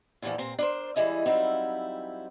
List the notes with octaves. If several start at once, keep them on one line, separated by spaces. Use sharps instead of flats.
E2 G2 A#2 C#3 E3 F3
A#2 C4 A#5
D4 A#4 C5
E3 G3 G#3 E4 D#5
F#3 G3 C4 D#4 E4 F5